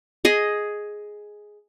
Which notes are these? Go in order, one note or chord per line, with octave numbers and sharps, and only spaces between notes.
G#4 D#5